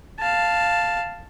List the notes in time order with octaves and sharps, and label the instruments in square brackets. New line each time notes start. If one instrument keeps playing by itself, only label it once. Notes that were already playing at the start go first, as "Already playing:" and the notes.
[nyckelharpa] F5 A5